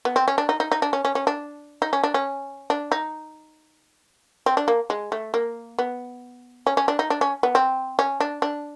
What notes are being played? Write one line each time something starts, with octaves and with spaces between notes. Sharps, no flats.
B3
C4
C#4
D4
D#4
D#4
D#4
D4
C#4
C#4
C#4
D4
D#4
C#4
D4
C#4
D4
D#4
C4
D4
A#3
G#3
A3
A#3
B3
C#4
C#4
D4
D#4
D4
C#4
B3
C4
C#4
D4
D4